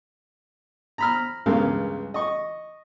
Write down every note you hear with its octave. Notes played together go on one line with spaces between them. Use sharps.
A#5 B5 F6
C#2 G2 C#3 A#4 F5
D#5 C#6